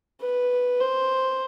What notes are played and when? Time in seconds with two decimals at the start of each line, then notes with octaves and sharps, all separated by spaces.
0.21 B4
0.80 C5